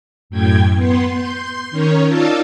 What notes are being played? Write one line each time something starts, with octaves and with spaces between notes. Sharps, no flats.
F#2 A2 G5 G#6
B3 C6
C6 G6
D#3 C#4 A#4 C#5
D#4 F4 D5 F5 A5 E6